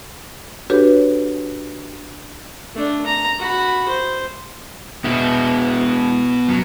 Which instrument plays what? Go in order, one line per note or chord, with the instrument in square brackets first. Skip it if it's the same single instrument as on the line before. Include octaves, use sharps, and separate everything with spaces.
[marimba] D4 F#4 G4 A4 B4 C#5
[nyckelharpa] A3 D4
A#5
F#4 B5
C5
[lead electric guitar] B2 B3 [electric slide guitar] G#3 E4
[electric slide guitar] F#2 F#3